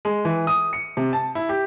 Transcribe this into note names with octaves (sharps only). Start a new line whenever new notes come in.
G#3
E3
D#6
C#7
C3
A5
E4
G4